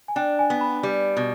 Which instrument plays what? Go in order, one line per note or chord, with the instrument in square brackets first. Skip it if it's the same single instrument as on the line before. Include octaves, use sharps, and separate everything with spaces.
[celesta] G#5
[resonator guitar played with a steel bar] D4 [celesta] G5
[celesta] G#5
[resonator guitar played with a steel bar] B3
[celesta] B5
[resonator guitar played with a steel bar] G3
B2